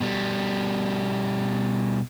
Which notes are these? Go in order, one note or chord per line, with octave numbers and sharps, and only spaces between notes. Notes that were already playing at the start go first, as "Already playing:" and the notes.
B2 G3